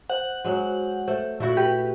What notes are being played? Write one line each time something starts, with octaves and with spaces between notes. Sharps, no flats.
C5 F#5
F#3 G#3
A3 C5
A#2 A3 E4 F#4
G4 B4